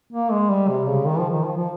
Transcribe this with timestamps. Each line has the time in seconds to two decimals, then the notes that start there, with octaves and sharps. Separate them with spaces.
0.12 A#3
0.32 G#3
0.50 G3
0.69 C3
0.87 C#3
1.06 D#3
1.19 F3
1.30 D#3
1.44 F3
1.57 F3